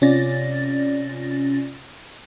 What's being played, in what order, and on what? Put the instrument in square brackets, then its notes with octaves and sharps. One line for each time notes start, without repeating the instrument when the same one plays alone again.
[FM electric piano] C3 C#4 F4 D5 A6 A#6